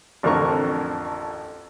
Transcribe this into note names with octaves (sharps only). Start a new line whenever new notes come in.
A1 F2 D3 A#4 A#5 C#6